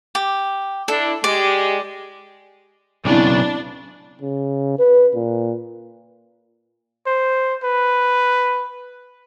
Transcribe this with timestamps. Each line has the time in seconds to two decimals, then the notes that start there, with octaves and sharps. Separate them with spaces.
0.15 G4
0.88 D4 E4 A4
1.24 G#3 G4 D5
3.05 B1 C#3 B3 C4 D4 E4
4.21 C#3
4.79 B4
5.15 A#2
7.06 C5
7.64 B4